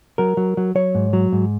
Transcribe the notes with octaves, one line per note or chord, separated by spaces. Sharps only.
F#3 A#4
F#3
F#3
F#3 C#5
G#2
F#3
G#2